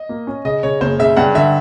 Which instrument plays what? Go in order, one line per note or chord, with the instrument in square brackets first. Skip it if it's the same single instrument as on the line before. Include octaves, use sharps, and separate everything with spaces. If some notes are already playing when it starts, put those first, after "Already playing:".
Already playing: [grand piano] D#5
[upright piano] A#3
C#4
[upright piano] C#3 [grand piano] D#5
[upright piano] C#3 [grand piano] C#5
[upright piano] F#1 [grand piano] C5
[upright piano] C#3 [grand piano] E5
[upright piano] G2 [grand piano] F#5
[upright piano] D3 [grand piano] E5